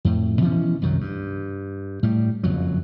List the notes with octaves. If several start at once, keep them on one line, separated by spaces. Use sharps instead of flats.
F2 A2
B2 E3 F3 C#4
C2 F#2 D#3 F#3
G2
A2 G3
F#1 F2 F#3